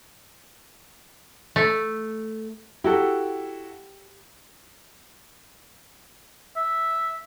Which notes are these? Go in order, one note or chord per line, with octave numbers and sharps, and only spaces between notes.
A3
E4 F#4 G4 A4
E5